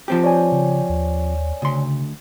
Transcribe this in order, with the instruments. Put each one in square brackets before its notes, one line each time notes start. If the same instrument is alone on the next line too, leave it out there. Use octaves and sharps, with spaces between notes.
[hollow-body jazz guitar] F3 C4 G4
[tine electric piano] C#5 D5 G#5
[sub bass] C#3
D#2
[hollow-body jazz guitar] D2 C6 [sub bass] C#3